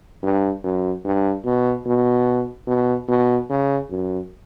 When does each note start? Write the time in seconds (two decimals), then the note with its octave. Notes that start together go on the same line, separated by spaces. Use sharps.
0.23 G2
0.64 F#2
1.04 G2
1.45 B2
1.86 B2
2.67 B2
3.08 B2
3.50 C#3
3.90 F#2